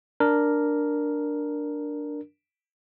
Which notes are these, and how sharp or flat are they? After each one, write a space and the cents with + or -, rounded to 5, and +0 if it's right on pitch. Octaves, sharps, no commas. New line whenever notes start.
D4 +0 A#4 +0